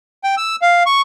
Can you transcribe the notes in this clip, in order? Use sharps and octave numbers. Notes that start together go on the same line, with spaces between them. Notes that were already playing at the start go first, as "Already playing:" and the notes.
G5
E6
F5
C#6